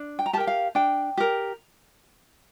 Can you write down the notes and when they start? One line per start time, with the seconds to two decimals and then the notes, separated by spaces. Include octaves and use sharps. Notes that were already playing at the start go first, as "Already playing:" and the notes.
Already playing: D4
0.19 G5
0.26 A#5
0.33 G4 A5
0.37 A#4 G5
0.47 F5
0.75 D4 G5
1.17 G4 A#4